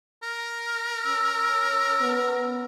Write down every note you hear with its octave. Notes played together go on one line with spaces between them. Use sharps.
A#4
C#4 E6
B3